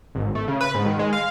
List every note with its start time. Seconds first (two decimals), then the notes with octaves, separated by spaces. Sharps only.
0.15 G#1
0.35 A3
0.48 C#3
0.61 B4
0.75 G#2
0.86 D#3
0.99 G#3
1.13 F5